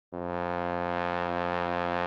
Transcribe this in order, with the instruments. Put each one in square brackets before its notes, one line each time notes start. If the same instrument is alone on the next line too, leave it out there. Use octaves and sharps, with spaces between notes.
[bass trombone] F2